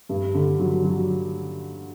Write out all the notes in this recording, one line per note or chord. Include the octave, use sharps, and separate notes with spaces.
G2
D3
F#3
F#3